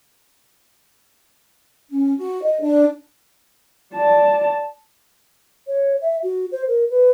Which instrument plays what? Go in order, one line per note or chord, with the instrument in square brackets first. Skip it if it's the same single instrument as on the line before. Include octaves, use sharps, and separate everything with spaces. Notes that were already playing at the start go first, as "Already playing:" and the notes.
[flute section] C#4
F#4
D#5
D4
[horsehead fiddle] D5 A5
[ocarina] C#5
E5
F#4
C5
A#4
B4